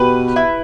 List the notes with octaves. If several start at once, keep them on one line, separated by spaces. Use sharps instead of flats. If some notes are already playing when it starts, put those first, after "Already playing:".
Already playing: B2 G4 B4
E4